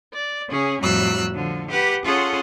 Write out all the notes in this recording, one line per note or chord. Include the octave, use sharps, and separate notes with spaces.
D5
C#3 C#4 G#4
F2 A2 F#3 G3 E6 F#6
D3 F3
G4 B4 F#5
C#4 F4 G#4 A4 F#5 C6